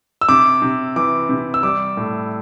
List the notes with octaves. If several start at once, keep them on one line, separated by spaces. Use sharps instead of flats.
E6
C3 D6
C3
E3 D6
C3
E6
G3 D6
A2